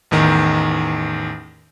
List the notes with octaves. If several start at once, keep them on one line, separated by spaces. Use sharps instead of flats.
A1 E2 D#3